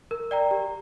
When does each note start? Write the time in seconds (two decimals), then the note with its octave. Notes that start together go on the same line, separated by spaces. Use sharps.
0.11 A#4
0.31 D5 G5 A#5
0.51 G4